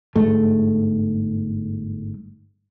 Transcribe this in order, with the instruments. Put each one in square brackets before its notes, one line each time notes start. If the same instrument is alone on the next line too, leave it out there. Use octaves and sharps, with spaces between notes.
[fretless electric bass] G1 G#2 A3